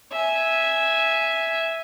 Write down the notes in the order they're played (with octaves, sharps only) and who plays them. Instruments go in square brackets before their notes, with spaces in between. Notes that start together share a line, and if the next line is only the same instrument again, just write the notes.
[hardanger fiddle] E5 G#5